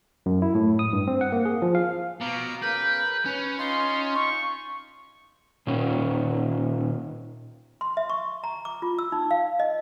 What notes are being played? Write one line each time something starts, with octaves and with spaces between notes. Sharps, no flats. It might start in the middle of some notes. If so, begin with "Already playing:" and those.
F#2
E4
A2
D#6
G2
C4
F#5
A#3
G#4
F3
F5
B2 F5 A#5 D6
C#3 A#4 B4 G6
C#4 B4
D#4 F4 C6
C#6
A#2 D#3 C#4
C6
E5
C#6
A#5
D6
F4
E6
D#4
F5
D#5